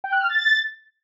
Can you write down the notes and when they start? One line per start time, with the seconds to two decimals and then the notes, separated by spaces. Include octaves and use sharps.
0.04 G5
0.12 F#6
0.21 F6
0.29 A6